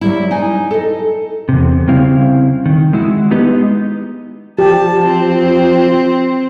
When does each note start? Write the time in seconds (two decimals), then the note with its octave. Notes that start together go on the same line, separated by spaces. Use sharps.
0.01 F#3 G3 E4
0.31 D#4 D5 G#5
0.71 A4 D#5
1.49 E2 C3
1.88 C#3 G3 C4 E4 F5
2.66 D#3
2.93 G#3 E4 F#4
3.31 G#3 B3 D#4 G4 B4 D#5
4.59 F3 G4 A5
5.06 C4